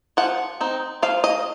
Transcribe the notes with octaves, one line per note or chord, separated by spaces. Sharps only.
F3 F#5
C4 D#4
F3 F5
D#5